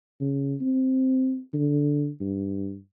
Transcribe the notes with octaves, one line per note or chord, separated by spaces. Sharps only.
C#3
C4
D3
G2